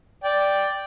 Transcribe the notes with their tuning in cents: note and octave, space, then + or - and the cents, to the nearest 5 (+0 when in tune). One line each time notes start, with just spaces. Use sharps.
D5 +0 G5 +0